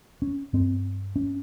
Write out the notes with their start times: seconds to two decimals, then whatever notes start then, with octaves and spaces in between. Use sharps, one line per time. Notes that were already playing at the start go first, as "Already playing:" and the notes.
0.22 C#4
0.53 G2 C4
1.16 C#4